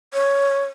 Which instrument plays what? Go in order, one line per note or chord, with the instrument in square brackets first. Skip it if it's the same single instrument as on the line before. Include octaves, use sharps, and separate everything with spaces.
[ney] C#5